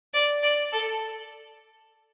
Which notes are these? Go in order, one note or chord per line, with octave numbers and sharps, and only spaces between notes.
D5
D5
A4